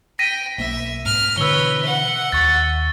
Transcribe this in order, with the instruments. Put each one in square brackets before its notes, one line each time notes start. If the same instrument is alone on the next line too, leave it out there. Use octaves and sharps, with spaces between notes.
[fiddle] G5 [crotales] A#6 B6 D#7
[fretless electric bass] B1 A#3 [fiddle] E5
[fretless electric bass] G#2 [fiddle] F6
[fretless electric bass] B2 D3 E3 [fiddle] B4 C#5 [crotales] E6 G7
[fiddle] E5 F#5
[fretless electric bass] D#2 [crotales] C#6 A6